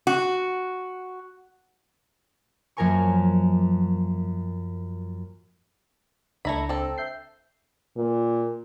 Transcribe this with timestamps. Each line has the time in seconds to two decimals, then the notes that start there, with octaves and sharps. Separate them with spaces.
0.07 F#4
2.77 F#2 F3 A#3 A#4 G#5 C#6
6.45 C#2 A3 D4 E4 A#5 B5
6.69 C4 A4
6.98 E5 G6 C7
7.97 A#2